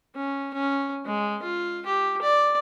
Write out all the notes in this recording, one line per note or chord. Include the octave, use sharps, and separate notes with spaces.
C#4
C#4
G#3
F4
G4
D5